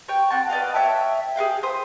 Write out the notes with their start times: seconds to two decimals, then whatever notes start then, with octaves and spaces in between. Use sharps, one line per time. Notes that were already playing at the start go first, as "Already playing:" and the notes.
0.08 C#5 G5
0.30 C4 F#5 A5
0.50 B4 D5 D#5 F5
0.74 C#5 E5 G5 A5
1.36 G#4 A#4 F5 G5
1.63 E4 C5 D#6 E6